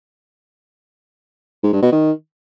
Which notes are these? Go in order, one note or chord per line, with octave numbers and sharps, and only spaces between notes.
G#2
G2
B2
D#3